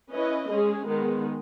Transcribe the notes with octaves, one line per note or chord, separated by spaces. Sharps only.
C#4 E4 B4 D#5
G#3 C#4 G#4
D#3 G#3 B3